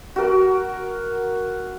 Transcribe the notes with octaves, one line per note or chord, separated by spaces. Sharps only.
F#4 A#4